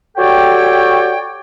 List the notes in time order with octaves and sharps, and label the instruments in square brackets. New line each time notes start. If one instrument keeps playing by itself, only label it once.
[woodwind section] F#4 G4 A4 C#5 D5 G5